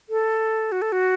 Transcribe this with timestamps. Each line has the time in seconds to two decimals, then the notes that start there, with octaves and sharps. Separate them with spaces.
0.09 A4
0.72 F#4
0.82 A4
0.92 F#4